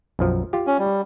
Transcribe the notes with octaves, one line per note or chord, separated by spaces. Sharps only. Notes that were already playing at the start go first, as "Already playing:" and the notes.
B1 F#2 F3
F4 G4
C#4
G3